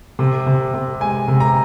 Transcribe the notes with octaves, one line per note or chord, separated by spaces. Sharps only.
C3
C3
C3
G#3 G#5
C3
A#5